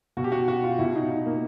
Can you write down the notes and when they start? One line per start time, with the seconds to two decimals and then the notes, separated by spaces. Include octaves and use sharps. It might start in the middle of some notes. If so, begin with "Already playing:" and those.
0.17 B2 F#4
0.24 G4
0.32 F#4
0.48 F#4
0.63 F4
0.79 B2 E4
0.95 D#4
1.10 D#4
1.26 A#3